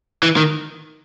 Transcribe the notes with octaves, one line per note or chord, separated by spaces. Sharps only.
E3
D#3